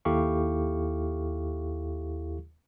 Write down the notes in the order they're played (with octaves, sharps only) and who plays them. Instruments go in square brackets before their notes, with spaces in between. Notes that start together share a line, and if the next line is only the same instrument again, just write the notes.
[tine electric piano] D#2 E4 G4 A4 F5 C#6